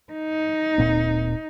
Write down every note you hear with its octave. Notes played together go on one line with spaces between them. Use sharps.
D#4
D1 A#2 C4